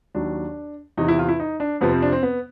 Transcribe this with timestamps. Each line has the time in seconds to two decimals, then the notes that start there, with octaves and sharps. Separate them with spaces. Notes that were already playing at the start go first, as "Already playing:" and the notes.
0.14 D#2 D#3 F#3 D4
0.97 E2 C3 E3 D#4
1.08 E4
1.19 F4
1.28 E4
1.40 D#4
1.60 D4
1.81 F2 C3 F3 B3
1.92 C4
2.02 D4
2.12 C4
2.23 B3